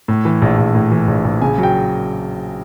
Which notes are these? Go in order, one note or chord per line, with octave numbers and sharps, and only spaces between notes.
A2
E3
A#1
A#1
A2
E3
A#1
A#1
C#3 G#5
F#3
G5